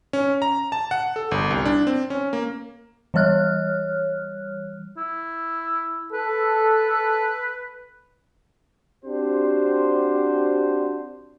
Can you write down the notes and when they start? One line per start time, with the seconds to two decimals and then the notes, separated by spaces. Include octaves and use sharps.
0.13 C#4
0.42 A#5
0.72 A5
0.91 F#5
1.16 A4
1.31 G1
1.51 C2
1.65 D4
1.87 C4
2.10 C#4
2.33 A#3
3.14 E3 G3 C#5 F6 F#6
4.97 E4
6.13 A4 B4
9.04 C4 D4 F#4 G4 C5